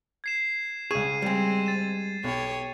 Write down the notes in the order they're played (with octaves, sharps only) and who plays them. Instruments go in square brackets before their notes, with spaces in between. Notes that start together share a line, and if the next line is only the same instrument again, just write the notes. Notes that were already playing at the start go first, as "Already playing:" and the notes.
[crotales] G#6 C7 E7
[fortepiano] C#2 C#6 [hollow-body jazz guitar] G#4 [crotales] G#6 D#7 E7
[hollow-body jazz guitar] G3 G#3 [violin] C4
[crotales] A6 E7
[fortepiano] B1 [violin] G4 C#5